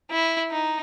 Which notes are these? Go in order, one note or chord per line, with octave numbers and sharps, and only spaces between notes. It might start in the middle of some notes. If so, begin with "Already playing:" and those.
E4
D#4